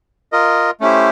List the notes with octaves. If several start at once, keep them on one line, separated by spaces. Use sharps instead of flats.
F4 A#4 D#5
A3 C#4 E4 G4 C5